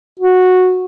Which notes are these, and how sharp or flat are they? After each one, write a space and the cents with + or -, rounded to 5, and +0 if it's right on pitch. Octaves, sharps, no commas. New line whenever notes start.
F#4 -10